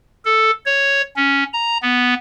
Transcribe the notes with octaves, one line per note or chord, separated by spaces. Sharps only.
A4
C#5
C#4
A#5
B3